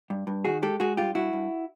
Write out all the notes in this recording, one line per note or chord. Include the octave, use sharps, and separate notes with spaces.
G2
G2
D#3 F#4 G#4
G#3 G4 A4
G#3 F#4 G#4
G2 F4 G4
G2 E4 F#4
G2